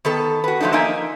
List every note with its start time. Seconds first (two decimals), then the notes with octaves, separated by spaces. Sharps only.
0.05 D#3 B3 A4
0.44 F#4 B4
0.60 F3 F#3 A3 D4 D#4
0.72 F3 A#3 D#4 D#5 E5 G#5